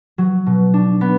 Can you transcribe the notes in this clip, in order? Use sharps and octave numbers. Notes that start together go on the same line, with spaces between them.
F#3
B2
D4
B3